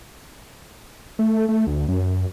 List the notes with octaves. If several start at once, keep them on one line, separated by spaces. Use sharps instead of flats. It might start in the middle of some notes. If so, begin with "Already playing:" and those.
A3
A3
D2
F#2